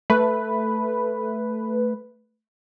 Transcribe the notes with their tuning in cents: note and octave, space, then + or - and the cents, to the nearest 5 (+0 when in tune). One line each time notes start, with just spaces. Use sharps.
A3 +0 B4 +0